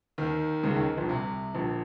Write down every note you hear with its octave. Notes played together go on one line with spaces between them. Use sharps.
D#2 D#3
C#2 C#3
D#2 D#3
A#1 A#2
C2 C3
A#1 A#2